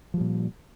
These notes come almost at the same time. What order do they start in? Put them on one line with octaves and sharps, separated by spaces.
F3 G3 A#2